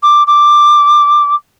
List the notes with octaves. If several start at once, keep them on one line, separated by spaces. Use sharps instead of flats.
D6
D6